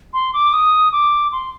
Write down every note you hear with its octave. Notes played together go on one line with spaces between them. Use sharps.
C6
D6
D#6
D6
C6